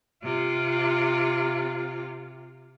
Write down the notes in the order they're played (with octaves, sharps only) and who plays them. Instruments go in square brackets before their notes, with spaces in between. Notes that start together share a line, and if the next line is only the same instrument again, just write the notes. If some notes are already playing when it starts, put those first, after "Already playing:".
[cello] C3 F4